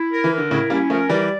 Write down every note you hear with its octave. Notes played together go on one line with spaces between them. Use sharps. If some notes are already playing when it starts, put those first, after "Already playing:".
Already playing: E4
A#4
E3
A#4
D3
A2 C#3 E4
G3 A#3 C#4
F3 A3 A#4
E3 G3 D5